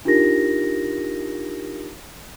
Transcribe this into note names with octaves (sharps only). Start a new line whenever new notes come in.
D4 D#4 F4 G4 A#4 A#6